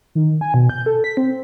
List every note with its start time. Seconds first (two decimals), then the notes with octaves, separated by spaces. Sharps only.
0.15 D#3
0.41 G#5
0.54 B2
0.69 G6
0.86 A4
1.04 B6
1.17 C4